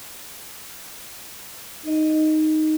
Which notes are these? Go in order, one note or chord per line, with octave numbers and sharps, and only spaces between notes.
D#4 D#5